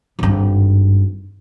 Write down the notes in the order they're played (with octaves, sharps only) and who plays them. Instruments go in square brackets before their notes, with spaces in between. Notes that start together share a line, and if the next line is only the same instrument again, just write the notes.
[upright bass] G#1 G2